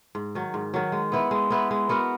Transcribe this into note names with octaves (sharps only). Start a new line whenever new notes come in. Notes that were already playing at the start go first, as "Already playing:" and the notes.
G#2
D#3 F#3
G#2
D#3 F#3
G#3
B3 E4 B4
G#3
B3 E4 B4
G#3
B3 F#4 A#4